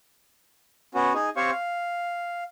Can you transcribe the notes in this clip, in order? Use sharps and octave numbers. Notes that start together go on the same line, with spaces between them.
B3 C#4 F#4
D#4 G#4
C4 G4 C5 C#5 F5 C#6
F5